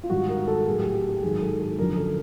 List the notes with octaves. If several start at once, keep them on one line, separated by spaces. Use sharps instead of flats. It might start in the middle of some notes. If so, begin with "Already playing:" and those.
F4
G#2 D#3 G3 F#4
A#4
A4
A2 F#3 G#4
G4
G4
G4
G#2 D#3 F#3 G#4
A4
A4
F#2 D3 F3 A#4
A4